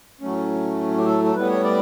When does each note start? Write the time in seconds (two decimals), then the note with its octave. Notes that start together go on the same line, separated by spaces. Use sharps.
0.21 A2 F#3 A3 C#4
0.98 G4
1.07 A4
1.24 A4
1.35 A2 G3 B3 B4
1.49 C#5
1.64 D5